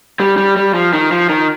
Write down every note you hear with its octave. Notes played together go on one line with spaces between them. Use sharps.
G3
G3
G3
F3
D#3
F3
D#3